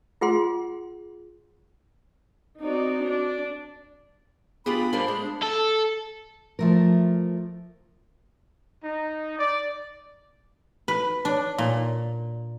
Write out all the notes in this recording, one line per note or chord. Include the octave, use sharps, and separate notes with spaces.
F4 G#4 F#5 C6
C4 D#4 F#4 D5
D4 D5
B3 D4 F4 G4 G#4 B5
G3 A#3 D4 F4 C5
G#3
A4
F3 A3 A#4
D#4
D5
B4
D4
A#2